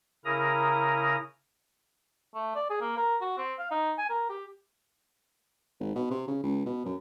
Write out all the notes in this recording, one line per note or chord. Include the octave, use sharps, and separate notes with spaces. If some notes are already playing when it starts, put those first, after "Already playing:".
C#3 E4 A#4 A#5 D#6
A3
D5
G#4
A#3
A#4
F#4
C4
F5
D#4
G#5
A#4
G4
G#1
B2
C3
C#3
C#2
B2
F#2